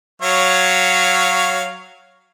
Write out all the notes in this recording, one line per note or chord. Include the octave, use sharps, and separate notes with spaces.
F#3 C#5 F5